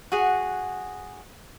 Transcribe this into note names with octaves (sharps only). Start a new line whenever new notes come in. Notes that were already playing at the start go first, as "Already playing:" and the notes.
F#4 G#4 F#5